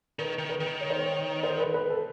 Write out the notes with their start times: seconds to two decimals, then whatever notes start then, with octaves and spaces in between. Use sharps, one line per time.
0.19 D#3 B4
0.39 D#3
0.49 B4
0.60 D#3
0.81 C#5
0.90 C5
0.99 C#5
1.43 C5
1.53 A#4
1.60 B4
1.74 B4
1.90 A4